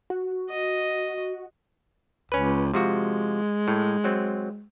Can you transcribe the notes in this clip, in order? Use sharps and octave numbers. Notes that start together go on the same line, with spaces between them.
F#4
D#5
C#2 C#4 B4
C3 F3 G#3 F#4
A2
F#3 C4